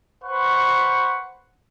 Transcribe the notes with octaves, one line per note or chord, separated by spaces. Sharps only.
B4 C5 F#5 C#6